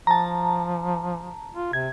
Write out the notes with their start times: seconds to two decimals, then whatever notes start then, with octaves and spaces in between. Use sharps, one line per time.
0.07 F3 A5 A#5
1.54 F4
1.73 C3 G#6